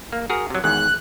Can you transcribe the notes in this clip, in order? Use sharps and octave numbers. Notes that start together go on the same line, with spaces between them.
A#3
F#4 G#4 A#4
C3 F#3
G#1 E2 G#2 F#6